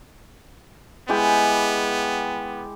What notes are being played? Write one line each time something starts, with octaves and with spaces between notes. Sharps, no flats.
G#3 B3 E4 G4